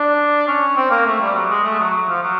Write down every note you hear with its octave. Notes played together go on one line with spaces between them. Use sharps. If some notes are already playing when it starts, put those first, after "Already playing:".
Already playing: D4
C#4
C4
A#3
A3
G3
F#3
G#3
A3
F#3
F#3
F3
F#3